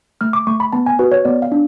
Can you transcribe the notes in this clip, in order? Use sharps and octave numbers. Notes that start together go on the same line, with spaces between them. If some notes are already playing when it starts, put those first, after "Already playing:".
A3 F6
D6
A3 C#6
B5
B3 A5
G#5
F#4 B4
C#5
B3 D5
F5
D4